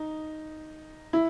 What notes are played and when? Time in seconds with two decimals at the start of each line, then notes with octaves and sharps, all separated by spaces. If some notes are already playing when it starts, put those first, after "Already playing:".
Already playing: D#4
1.13 E4